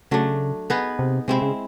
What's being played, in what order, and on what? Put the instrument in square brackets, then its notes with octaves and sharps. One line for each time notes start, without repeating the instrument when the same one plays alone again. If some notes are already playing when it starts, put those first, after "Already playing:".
[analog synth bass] C#3 [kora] F#3 A3 D4
[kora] B3 D#4 G#4 B4
[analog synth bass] C3
[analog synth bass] C3 [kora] G#3 C4 E4
[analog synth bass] C#3